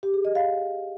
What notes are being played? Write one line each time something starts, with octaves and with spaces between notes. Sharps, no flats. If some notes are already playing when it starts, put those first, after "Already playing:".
G4
G#4
D#5
F5